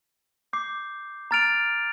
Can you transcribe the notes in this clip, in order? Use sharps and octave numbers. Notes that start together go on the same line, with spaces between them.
D6 G6 C7
A#5 F6 A6 D7 F7